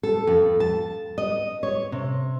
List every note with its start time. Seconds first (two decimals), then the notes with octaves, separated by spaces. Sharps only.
0.03 A4
0.27 F2
0.60 A5
1.18 D#5
1.63 C#5
1.92 C3